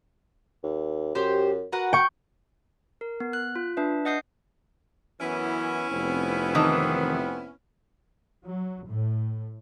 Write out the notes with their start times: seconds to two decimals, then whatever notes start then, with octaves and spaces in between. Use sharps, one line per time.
0.64 D#2
1.15 F#2 G4 C5 G5
1.73 F#4 A#4 B4 F#5
1.93 G5 C#6 G6
3.01 A#4
3.20 B3
3.33 F#6
3.56 F4
3.77 D4 B4 E5
4.05 D#5 F#5 D#6 G6 C7
5.21 F#2 E3 B3 C#4 E4
5.91 F1 B3 C4
6.55 D#3 E3
8.43 F#3
8.87 A2